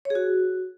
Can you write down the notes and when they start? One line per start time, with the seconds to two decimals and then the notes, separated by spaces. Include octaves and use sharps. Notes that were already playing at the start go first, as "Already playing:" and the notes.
0.05 C#5
0.10 G#4
0.15 F#4